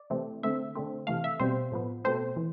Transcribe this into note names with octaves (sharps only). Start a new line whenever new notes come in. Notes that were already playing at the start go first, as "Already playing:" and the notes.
Already playing: D5
C3 E3 A3 C4
D3 A3 C4 E5
D3 A3 C4
C3 E3 A3 F5
E5
B2 G3 C4 C5
A2 F3 B3
B2 A3 C4 C5
E3